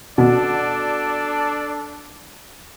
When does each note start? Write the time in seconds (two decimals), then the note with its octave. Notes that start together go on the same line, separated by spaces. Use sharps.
0.18 B2 D4 A4 D5